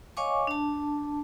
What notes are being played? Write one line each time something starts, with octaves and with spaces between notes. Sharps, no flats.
C#5 D#5 F5 G#5 C#6 D6
D4 A5